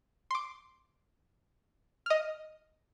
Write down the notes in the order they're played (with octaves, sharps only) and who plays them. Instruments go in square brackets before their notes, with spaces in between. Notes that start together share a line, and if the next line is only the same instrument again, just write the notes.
[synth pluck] C6 D6
D#5 F6